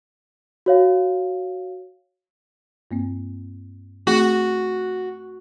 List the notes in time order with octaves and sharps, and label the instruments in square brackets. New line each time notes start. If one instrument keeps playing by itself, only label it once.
[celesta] F#4 C#5 F5
[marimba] G2 A#3 C4
[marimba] A3 C4 G#4 [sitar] F#4